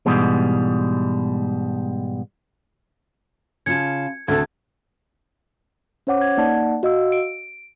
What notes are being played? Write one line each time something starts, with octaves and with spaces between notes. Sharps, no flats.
G#2 B2 E3 G3 G#3
C#3 F4 A5 G#6 C#7
D2 C3 A4 G#6
C#4 C5 C#5 F#5 D6
G#6
A#3 D#4 D5 F#5 A5
F#4 D#5 F5 E6
D7